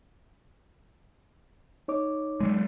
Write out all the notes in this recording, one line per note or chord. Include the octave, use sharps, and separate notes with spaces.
D#4 C#5 D6
F#3 G#3